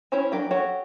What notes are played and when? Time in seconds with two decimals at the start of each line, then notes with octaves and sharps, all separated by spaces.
0.12 C#4 E4 C5 C#5 G#5
0.32 F#3 D4 G4 A#4
0.51 F#4 G4 A4 C#5 F#5